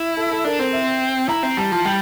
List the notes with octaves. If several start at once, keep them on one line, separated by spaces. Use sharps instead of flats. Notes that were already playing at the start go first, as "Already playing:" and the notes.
Already playing: E4
A4
A4
D4 A#4
C4 C5
E5
E4 A#5
C4
G3 A5
F3 A5
G3 G5